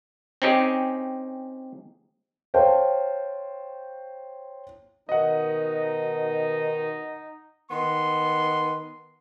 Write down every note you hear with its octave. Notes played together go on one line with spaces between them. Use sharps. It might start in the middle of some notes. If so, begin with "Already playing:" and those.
C4 C#4 D#4 G4 G#4
C5 C#5 F5 G5 A5
B2 D#3 D#4 D#5 F#5
D#3 B3 C6